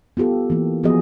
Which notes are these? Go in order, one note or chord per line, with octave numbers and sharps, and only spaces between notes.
B3 F4 G4 A4
E3 A#3
F3 B3 F4 F#4 G#4 D#5